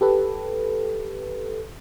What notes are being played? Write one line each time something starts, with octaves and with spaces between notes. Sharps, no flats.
G4 A4 B4